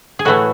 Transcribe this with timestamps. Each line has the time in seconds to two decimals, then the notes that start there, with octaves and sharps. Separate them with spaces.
0.19 G#4
0.25 A2 E3 A3 F#4